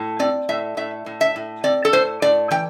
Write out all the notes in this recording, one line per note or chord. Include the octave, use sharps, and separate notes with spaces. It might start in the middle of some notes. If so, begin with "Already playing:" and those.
Already playing: A2
C4 D5
A2 E5
A2 E5
A2
E5
A2
C4 D5
A4
A2 C5
A2 D5
E3 G5